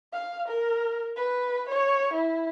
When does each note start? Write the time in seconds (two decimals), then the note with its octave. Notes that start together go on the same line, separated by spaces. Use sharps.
0.13 F5
0.48 A#4
1.17 B4
1.69 C#5
2.13 E4